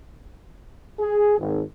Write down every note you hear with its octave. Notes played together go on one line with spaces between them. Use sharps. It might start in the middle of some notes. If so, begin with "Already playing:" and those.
G#4
G#1